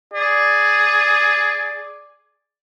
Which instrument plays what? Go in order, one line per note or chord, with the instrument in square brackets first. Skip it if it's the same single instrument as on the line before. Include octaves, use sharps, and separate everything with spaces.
[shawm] G#4 [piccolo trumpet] D5